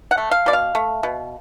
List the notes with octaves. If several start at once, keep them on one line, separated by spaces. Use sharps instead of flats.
F#5
A3
F5
B2 D5
F5
A3
B2